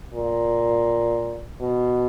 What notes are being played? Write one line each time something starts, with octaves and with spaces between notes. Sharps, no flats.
A#2
B2